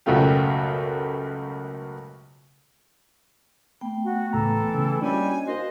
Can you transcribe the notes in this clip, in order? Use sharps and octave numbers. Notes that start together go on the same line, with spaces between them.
C#2 F#2 B2 A3 F4 G4
A3 B3 G5
F#4
C#2 A2 E3 A4 A#5
C#3
G3 A#3 C#4 D4 E4 F#4 D#5 G#5
F#4 A#4 C5 D#5 F5